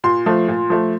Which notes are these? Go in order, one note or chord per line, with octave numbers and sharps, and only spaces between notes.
A#2 C6
F3 A3
A#2
F3 A3